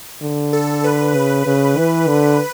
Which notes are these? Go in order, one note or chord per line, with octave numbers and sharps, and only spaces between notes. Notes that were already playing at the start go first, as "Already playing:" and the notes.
D3
A4
B4
C#3 B4
C#3
E3
D3